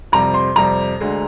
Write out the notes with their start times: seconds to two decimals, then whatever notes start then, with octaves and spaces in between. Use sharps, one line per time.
0.12 F2 C3 G3 A#5
0.34 C6
0.56 F2 C3 G3 A#5
1.00 D2 D3 G#3